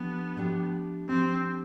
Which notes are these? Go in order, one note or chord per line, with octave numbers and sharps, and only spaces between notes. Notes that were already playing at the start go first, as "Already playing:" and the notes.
Already playing: F3 A3 B3 D4 G4
F3 A3 D4 G4
F3 A3 C4 D4 G4